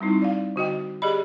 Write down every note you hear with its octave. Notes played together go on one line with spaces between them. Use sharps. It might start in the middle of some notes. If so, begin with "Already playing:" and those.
G3 C4 D#4 E4
D5 F5
D3 F#4 D#5 G5
G4 G#4 D5 D#5 B5